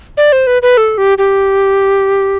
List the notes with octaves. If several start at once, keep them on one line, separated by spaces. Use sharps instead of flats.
D5
C5
B4
B4
A4
G4
G4